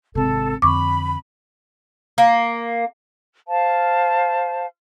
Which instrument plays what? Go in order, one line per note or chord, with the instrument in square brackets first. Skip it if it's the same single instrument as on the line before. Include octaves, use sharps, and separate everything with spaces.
[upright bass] G#1 C3 [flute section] A4
[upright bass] F2 D3 [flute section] B5 [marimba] C#6 D6
[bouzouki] A#3
[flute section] C5 F5 A5